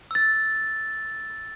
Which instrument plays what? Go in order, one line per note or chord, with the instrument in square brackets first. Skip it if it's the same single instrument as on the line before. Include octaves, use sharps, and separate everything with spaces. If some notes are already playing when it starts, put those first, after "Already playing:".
[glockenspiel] E6 A6